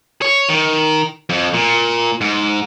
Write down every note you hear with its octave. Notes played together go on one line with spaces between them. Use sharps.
C#5
D#3
F2
A#2
G#2